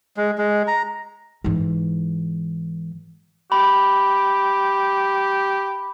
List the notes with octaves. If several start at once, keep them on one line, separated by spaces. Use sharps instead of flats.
G#3
G#3
A#5
G#2 E3
G4 B5